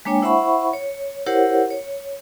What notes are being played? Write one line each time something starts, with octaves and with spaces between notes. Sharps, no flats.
G#3 A#3 D4 C#5 G5 G#5
E4 C5 E5 F#5 B5 C#6
C#5
E4 G4 A#4 C5 C#5 F#5
C#5